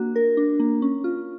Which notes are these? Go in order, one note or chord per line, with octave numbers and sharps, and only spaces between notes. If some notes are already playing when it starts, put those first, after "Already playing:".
Already playing: A#3 D4 F#4
A#4
D4
A#3
C#4
F4